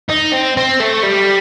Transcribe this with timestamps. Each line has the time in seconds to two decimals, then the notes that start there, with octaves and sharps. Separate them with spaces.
0.10 D#4
0.33 C4
0.57 C4
0.80 A3
1.03 G3